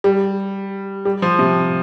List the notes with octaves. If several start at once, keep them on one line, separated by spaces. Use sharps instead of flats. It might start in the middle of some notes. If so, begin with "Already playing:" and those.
G3
G3
F3
C3